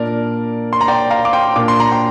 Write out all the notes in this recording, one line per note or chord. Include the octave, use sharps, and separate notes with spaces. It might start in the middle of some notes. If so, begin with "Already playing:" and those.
Already playing: A#2 A#3 D4 A#4 D5
C6
A#5
D5 G5
F5 A#5
D6
G5 C6
A#2 A#3 D4 D6
C6
A#5
G5 C6